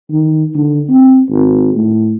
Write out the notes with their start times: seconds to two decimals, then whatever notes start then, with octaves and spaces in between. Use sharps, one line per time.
0.11 D#3
0.55 D3
0.89 C4
1.30 G#1
1.74 A2